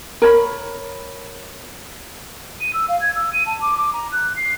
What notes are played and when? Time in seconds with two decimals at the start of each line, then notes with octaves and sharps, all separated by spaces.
0.22 A#4 C#5 B5
2.60 D#7
2.73 E6
2.88 F5
3.01 G#6
3.15 E6
3.33 D#7
3.46 A5
3.61 D6
3.77 D6
3.93 A#5
4.12 F#6
4.36 C7